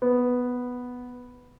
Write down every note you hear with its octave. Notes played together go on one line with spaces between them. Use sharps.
B3